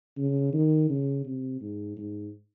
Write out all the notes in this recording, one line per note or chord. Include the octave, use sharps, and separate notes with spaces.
C#3
D#3
C#3
C3
G#2
G#2